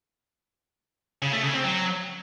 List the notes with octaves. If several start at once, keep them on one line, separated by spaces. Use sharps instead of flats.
C#3
A3
C#3
C4
F#3